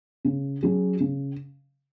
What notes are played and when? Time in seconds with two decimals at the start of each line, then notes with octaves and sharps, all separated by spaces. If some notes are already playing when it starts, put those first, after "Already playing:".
0.25 C#3
0.62 F#3 C#4 G#4
1.00 C#3